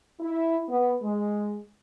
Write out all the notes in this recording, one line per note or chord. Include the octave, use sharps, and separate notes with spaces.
E4
B3
G#3